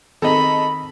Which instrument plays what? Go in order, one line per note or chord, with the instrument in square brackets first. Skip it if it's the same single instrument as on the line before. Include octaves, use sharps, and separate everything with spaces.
[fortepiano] D#3 C4 G#4 [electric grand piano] A4 D#5 A#5 [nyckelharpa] B5